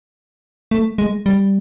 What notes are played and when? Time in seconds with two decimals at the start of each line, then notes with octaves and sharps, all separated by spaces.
0.71 A3
0.98 G#3
1.26 G3